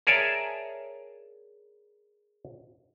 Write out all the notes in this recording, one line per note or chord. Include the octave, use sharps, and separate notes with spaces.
G#4 A#4 C#5 D5 E5 A5